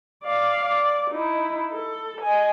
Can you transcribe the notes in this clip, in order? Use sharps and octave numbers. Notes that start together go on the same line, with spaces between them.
D5 F5
D5
D#4 E4
A4
D#5 G#5